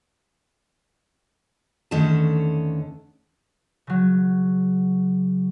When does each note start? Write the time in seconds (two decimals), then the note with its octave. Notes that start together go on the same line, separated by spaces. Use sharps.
1.91 E2 D3 D#3 A3 C#4 A5
3.87 C#3 F#3